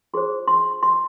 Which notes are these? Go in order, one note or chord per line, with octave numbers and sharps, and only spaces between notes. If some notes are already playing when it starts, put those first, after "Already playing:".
F4 G#4 C5 C6
C6
C6